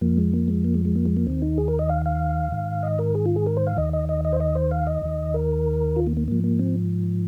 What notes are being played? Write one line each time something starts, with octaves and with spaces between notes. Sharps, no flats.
F2 F3 A#3
G#3
A#3
G#3
A#3
G#3
G#3
A#3
G#3
A#3
D#2 D#3 C4
D#4
G#4
A#4
D#5
F5
F5
G#2 D#3
D#5
A#4
G#4
F4
G#4
A#4
C5
F5
D#2 D#3 D#5
D#5
D#5
D#5
C5
D#5
C5
F5
D#5
D#2 D#3
A#4
F4
A#3
A#3
G#2 F3 A#3
A#3
C4